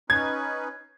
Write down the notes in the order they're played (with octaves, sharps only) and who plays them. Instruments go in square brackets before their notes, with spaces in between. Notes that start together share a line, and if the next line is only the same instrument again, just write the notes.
[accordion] C#4 D#4 B4 [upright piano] G#6